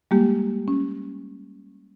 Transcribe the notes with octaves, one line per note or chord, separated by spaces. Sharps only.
G3 G#3 A#3 G4
C#4